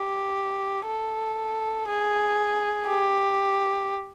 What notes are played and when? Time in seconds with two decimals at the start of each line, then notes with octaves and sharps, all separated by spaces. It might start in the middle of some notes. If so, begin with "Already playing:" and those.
Already playing: G4
0.87 A4
1.88 G#4
2.88 G4